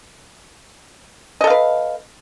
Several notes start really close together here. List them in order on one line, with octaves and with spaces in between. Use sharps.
D#5 A4 F5 B4